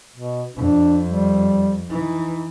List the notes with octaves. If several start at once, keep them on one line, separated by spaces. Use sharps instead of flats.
B2
F2 D4
G3
E3 D#4